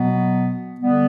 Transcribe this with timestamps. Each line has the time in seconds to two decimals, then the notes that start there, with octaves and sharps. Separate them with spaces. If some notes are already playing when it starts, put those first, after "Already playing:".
Already playing: B2 F#3 B3
0.80 D3 G3 B3